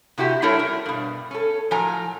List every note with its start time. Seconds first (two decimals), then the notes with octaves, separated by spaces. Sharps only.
0.18 C3 E4 F#4 G4
0.42 G3 A3 E4 A4 A#4 C#5
0.59 A#4
0.86 G2 B2
1.31 C#4 A4
1.71 A2 F3 F#3 A#4 G#5 A#5